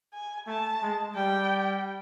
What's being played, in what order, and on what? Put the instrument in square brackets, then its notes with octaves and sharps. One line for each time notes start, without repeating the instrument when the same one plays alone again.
[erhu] G#5
[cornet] A3 [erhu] A5
[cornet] G#3
[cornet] G3 [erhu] G5